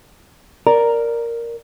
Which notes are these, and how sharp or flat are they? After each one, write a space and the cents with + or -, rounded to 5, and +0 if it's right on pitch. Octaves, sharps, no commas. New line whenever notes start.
A#4 +0 D5 +0 A#5 +0